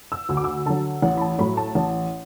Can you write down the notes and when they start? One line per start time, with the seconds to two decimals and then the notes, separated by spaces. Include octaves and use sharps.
0.12 E6
0.29 D2 E6
0.37 D6
0.44 E6
0.66 D3 F#3 A5
1.02 A1 F#5
1.17 B5
1.21 A5
1.38 A2 F#3 B5
1.57 A5
1.75 A1